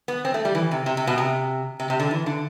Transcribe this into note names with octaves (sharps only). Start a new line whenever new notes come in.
B3
C4
A3
G3
E3
C3
C3
C3
B2
C3
C3
C3
D3
E3
D3